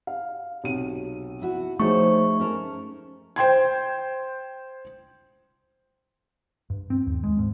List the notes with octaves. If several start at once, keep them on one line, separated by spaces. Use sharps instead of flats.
F5
B1 C3 D#7
E4 F#4 F#5
F3 A3 D#4 G#4 C5 C#5 C#6
C#4 A#4 A5
C5 G5 C6 G#6
G2
C4
D#2
G#3
G#2